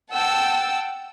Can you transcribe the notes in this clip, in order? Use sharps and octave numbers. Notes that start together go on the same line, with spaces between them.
F#5 G5 A5 E6